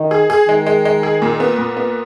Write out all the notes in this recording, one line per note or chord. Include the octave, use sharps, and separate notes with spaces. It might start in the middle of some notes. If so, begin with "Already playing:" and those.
Already playing: D#3
G#4
G#4
D#3 G#3
G#3
G#3
G#4
A#2
B3
A#2
B3